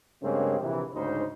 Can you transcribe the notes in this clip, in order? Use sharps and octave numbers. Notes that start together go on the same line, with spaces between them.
G2 C#3 G#3 A#3 C4
A#1 C3 E3
D2 G#2 C#3 D#4 C5